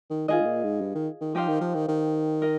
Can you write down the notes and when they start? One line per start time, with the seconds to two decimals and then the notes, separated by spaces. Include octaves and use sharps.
0.10 D#3
0.28 D#3 F4 G#4 D#5
0.40 G#2
0.45 A#2
0.63 G#2
0.81 G2
0.95 D#3
1.21 D#3
1.34 F3 D#4 G4 C5 F5
1.48 D#3
1.61 F3
1.74 D#3
1.88 D#3
2.42 A#4 D#5